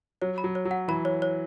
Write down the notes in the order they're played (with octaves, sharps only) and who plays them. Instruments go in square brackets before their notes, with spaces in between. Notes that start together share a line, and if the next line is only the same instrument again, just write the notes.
[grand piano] F#3 [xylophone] C#5
[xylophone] B5
[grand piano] F#3
[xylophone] C#5
[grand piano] F#3
[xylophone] F#5
[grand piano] E3 [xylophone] B5
[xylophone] C#5
C#5